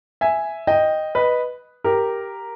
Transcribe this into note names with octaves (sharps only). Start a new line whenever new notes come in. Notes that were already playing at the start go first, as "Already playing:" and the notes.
E5 G#5
D#5 G5
B4 D#5
G4 A#4